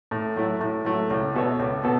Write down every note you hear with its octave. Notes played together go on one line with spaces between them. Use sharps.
A2
F#3 A3 E4
A2
F#3 A3 E4
C#2
B2 B3 A4 C#5
C#2
B2 B3 A4